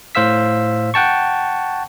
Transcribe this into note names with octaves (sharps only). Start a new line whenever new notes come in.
A2 C5 F5 E6 B6
F#5 G5 A5 C#6